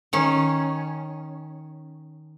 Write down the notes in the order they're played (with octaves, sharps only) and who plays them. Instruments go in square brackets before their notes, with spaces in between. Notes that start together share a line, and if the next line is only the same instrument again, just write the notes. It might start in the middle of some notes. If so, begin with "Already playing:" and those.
[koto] D#3 C#4